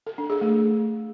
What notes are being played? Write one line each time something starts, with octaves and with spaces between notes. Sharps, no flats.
A4
D4
G#4
A3